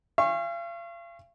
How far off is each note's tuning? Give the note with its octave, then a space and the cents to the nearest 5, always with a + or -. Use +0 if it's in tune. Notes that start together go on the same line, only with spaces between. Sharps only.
F5 -40 G#5 -45 C#6 -25